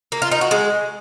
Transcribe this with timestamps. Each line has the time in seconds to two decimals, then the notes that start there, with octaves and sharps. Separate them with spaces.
0.12 A#3
0.22 F4
0.32 D#4
0.41 F#4
0.51 G#3